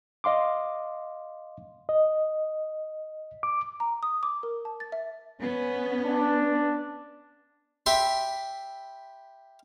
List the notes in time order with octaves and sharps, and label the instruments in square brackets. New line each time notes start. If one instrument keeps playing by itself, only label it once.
[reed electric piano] D#5 F5 C6 D6
D#5
D6
[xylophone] A#5
D#6
D6
A#4
A5
A6
E5
[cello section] B3 C#4
[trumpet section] D4
[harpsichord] G4 E5 B5 C6